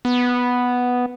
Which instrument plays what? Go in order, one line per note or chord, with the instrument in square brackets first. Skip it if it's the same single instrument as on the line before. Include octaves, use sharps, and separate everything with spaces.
[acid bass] B3